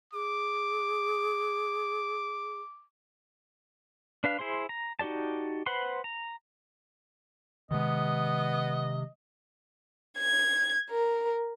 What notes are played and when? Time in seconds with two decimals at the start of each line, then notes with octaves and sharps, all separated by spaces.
0.13 G#4 D6
4.24 D4 B4 F5
4.39 E4 G#4 C5 C6
4.69 A#5
4.99 D#4 F#4 G4 D5 A5
5.66 B4 C5 F#5 B5 C6
6.04 A#5
7.71 C3 D#3 G#3 B3 D#5
10.19 G#6
10.89 A#4